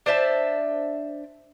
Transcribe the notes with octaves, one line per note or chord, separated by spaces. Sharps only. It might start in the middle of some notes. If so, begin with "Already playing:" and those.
D4 C5 E5 A5